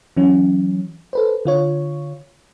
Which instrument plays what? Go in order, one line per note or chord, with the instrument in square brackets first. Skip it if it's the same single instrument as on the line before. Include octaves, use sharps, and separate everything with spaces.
[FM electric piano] E3 F#3 C#4
A4 B4 C5
D3 F4 C#5